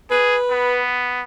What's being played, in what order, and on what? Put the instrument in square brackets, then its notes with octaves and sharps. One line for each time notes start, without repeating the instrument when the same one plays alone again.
[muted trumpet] G#4 [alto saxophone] B4
[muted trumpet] B3